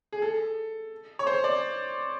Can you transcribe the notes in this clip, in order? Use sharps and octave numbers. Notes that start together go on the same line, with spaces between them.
G#4
A4
C#5
C5
D5